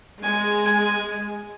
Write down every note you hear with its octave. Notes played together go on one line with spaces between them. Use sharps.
G#3 G#5